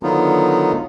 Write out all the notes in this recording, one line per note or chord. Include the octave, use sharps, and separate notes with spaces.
D3 D#3 F#3 B3 D#4 F4